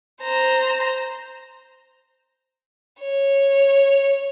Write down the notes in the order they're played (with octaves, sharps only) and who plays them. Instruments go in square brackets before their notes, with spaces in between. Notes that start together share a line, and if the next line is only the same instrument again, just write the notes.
[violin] C5 A#5
C#5